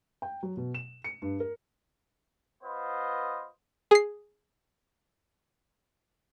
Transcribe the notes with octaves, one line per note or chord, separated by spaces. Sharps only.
G5
F#3
B2
E7
C#7
G2
A#4
B3 F4 B4 C5 D#5
G#4 C7